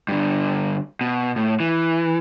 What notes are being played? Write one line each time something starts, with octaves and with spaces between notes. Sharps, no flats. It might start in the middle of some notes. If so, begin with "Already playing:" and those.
G2 D3
B2
A2
E3